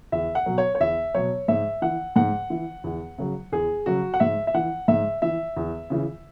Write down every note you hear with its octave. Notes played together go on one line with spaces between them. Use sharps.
E2 E5
F#5
B2 F#3
C#5
C#5
E2 E5
B2 F#3 C#5
G#2 E5
E3 F#5
G#2 F#5
E3
E2
C#3 F#3
E2 G#4
C#3 F#3 F#4
F#5
G#2 E5
E5
E3 F#5
G#2 E5
E3 E5
E2
C#3 E3